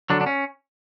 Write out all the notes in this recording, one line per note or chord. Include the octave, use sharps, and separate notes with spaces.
D3 F#3 D4
D4
C#4